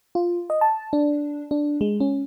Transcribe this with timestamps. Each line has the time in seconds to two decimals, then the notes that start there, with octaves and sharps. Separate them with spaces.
0.15 F4
0.50 D#5
0.61 A5
0.93 D4
1.51 D4
1.81 G#3
2.00 C#4